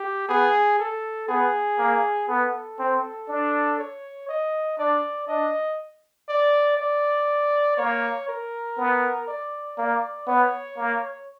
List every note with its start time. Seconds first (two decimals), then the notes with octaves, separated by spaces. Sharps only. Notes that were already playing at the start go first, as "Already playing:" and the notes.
Already playing: G4
0.29 B3 G#4
0.79 A4
1.29 B3 G#4
1.79 A#3
2.29 B3 A4
2.79 C4
3.28 D4
3.79 C#5
4.29 D#5
4.79 D4 D5
5.28 D4 D#5
6.29 D5
6.77 D5
7.77 A#3 C#5
8.28 A#4
8.78 B3
9.28 D5
9.78 A#3 D5
10.27 B3 C#5
10.77 A#3